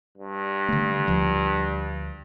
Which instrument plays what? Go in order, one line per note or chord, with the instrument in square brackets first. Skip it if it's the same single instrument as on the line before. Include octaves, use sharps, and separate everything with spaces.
[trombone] G2
[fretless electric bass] D3 A3
D2 F3